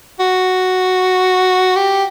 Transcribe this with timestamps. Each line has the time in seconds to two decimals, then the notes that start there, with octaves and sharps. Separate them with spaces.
0.19 F#4
1.76 G4